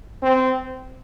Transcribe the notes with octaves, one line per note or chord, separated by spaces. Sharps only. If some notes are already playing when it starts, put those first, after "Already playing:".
C4